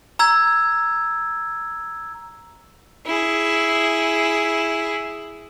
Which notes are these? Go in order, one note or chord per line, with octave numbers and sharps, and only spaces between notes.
A#5 E6 G#6
E4 G#4